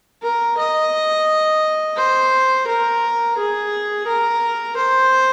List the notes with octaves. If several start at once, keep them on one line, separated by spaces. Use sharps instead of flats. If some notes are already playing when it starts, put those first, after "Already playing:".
A#4
D#5
C5
A#4
G#4
A#4
C5